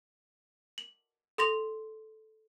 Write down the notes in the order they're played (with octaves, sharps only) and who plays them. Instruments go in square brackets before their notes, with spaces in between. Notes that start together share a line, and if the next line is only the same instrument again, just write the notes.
[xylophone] F#7
A4 C6 A#6 F7